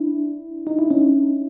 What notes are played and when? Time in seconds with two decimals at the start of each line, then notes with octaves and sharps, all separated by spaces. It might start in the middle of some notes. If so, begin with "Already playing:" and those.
Already playing: D4 E4
0.67 D#4
0.79 E4
0.90 C#4 D#4